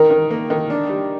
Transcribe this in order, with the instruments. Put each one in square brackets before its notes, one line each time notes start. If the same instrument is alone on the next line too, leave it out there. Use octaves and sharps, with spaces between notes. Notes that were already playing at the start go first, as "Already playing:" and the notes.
Already playing: [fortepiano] D#3 [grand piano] A#4
[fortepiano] D#3
A#3
D#3
D4
G3